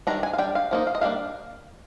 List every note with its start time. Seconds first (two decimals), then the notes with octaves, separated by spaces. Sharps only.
0.07 D#3 G3 D4 A#5
0.23 G#5
0.33 F5
0.38 G3 D4 G5
0.55 F5
0.71 F3 A#3 D#4
0.87 F5
0.95 D#5
1.01 G3 A#3 D4 F5